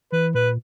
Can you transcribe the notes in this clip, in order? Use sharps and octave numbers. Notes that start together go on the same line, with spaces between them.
E3 B4
A#2 B4